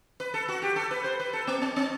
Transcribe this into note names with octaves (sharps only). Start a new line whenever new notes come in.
B4
A4
F#4
G4
A4
B4
C5
B4
A4
B3
C4
C4